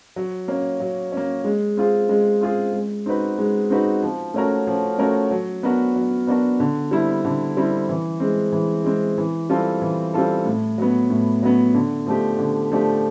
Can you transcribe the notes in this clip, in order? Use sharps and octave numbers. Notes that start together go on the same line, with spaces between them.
F#3
A#3 C#4
F#3
A#3 C#4
G#3
C4 F4 G#4
G#3
C4 F4 G#4
G#3
C4 D#4 F#4 B4
G#3
C4 D#4 F#4 B4
F3
A3 C#4 F#4 A#4
F3
A3 C#4 F#4 A#4
F#3
B3 D4 F#4 A#4
F#3
B3 D4 F#4 A#4
D3
G3 C4 E4
D3
G3 C4 E4
E3
G#3 C4
E3
G#3 C4
E3
G3 C4 F4 A4
E3
G3 C4 F4 A4
A2
F#3 B3
A2
F#3 B3
D3
F3 A3 D4 G4
D3
F3 A3 D4 G4